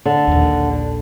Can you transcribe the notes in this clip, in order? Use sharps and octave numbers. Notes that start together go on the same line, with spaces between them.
D3
A#1 D#2